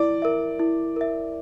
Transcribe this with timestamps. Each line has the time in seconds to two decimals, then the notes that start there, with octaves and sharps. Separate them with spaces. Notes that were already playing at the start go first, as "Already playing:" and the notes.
Already playing: E4 D5
0.22 A#4 E5
0.59 E4
0.96 A#4 E5